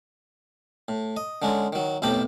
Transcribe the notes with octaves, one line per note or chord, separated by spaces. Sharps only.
A2
D#5
D3 G#3 C#4
D#3 F#3
B1 F2 A2 G4 A5 B5